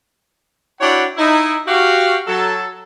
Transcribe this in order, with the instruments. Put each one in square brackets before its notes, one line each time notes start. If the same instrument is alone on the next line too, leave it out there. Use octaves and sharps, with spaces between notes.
[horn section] D4 E4 F#4 C#5 F#5 G5
D#4 E4
F#4 G4 F5
F#3 A4